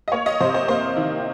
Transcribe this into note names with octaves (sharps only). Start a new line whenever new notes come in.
D#5
A#3 C#5
D#5
C3 C5
C5
A#3 C5
D#3